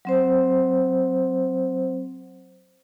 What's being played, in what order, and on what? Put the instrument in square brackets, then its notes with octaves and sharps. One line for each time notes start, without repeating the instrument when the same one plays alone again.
[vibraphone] F#3 C4 C5